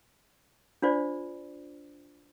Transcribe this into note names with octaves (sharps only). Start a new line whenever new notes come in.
D4 F4 C5 D5